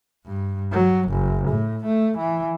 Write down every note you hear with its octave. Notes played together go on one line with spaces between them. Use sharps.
G2
F#3
F#1
A2
A3
E3